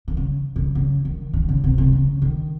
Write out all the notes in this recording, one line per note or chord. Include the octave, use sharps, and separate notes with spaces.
D#3
C#3
C#3
C#3
D#3
D#3
C#3
C3
C3
C#3
D#3